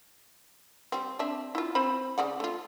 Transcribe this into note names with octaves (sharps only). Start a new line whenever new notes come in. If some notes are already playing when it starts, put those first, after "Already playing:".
G3 C4
C4 D4 E5
E4 F4
C4 C5 B5
C#3 D5 F#5
A3 F4